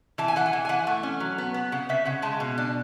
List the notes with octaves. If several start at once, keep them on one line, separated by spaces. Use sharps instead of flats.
E3 A5
G#5
E3 F#5
G#5
E3
G#5
E3 F#5
A3
C#4
F#3
B3
B3
C#3 F#5
C#3 E5
C#3 F#5
G#3 A5
B2
D4